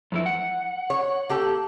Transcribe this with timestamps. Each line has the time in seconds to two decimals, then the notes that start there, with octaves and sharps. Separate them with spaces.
0.12 F2 E3 E4
0.26 F#5
0.90 C#5
1.29 A#3 G4 A4